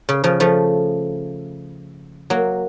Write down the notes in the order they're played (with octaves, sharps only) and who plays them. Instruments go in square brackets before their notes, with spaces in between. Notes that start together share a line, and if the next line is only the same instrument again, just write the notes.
[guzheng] C#3
C#3 F3
F3 A3
F#3 A#3